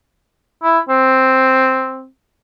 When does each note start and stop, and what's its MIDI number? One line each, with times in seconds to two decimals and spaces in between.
0.63 0.79 64
0.89 2.06 60